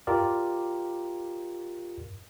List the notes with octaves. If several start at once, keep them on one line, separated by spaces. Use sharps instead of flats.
F4 G4 A#4 D5